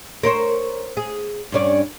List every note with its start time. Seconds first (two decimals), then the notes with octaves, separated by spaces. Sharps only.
0.23 A#4 C5 C#5
0.97 G#4
1.52 G2 C#4 D5